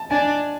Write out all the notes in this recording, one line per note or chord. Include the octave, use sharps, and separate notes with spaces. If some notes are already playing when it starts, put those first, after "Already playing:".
Already playing: A5
D4 G#5